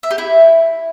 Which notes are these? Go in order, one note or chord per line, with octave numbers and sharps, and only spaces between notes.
E5
G4
E4